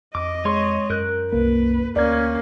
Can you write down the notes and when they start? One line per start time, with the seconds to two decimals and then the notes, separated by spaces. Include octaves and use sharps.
0.15 F2 D#5 D6
0.45 G#3 C#5 C6 C#6
0.90 F#2 A#4 F#6 G6
1.33 C2 A#3 B4
1.96 D2 A#3 C#4 D5 G#6